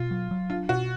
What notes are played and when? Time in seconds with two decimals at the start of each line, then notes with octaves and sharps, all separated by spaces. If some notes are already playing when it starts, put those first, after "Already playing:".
Already playing: B2 F4
0.11 F#3
0.31 F#3
0.50 D4 F4
0.69 B2 F#4